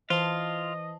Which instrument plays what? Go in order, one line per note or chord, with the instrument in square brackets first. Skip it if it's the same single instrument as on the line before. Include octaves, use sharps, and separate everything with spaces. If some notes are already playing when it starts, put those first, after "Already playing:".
[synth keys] E3 [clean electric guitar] F4 [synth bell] C5 A5 [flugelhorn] D#5